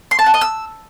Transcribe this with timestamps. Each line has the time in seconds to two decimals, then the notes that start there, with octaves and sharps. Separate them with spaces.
0.11 C6
0.19 A5
0.26 F#5
0.34 D#5
0.41 E6